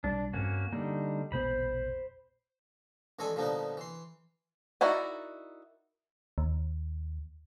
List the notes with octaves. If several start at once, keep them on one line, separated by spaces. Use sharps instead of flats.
B1 G3 D4
E2 G2 A#3 C4 C#4 F#4
D3 G3 A#3 D#4
E1 A#1 B3 C5 B5
A1 D#3 G#3 A4 D5 G#5
A#2 D3 F3 G3 B3 D#4
E3 C6
D#4 E4 F#4 A#4 D5
D#2